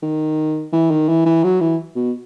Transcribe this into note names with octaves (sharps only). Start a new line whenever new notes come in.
D#3
E3
D#3
E3
E3
F#3
E3
B2